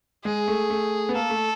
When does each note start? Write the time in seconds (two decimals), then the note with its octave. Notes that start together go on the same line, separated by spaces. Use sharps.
0.25 G#3 G#4
0.48 A3
0.70 A3
1.09 B3
1.15 A#3 A4
1.30 A3